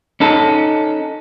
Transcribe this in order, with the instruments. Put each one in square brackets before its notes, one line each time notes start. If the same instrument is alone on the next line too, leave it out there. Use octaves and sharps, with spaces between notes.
[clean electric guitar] C#4 D#4 A4